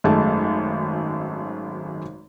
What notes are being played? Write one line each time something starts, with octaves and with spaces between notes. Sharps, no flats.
G#1 F#2 G#3 A3 A5